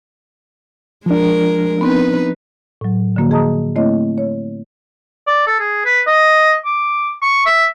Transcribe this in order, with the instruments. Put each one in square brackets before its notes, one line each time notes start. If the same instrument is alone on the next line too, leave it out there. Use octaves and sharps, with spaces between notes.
[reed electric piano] F3 D4 [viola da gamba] G#3 A#4
[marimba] B3 C4 [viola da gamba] D#4 B4
[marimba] A2 F#3
D3 F3 A#3 F#4
G#4 D#5 A5 A#5 D#6
A3 A#3 C4 E4 C#5 D#5
C#5
[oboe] D5
A4
G#4
B4
D#5
D6
C#6
E5